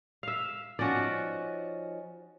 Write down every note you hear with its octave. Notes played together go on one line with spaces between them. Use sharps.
E5 F5
F3 C#4 D#4 F#4 D5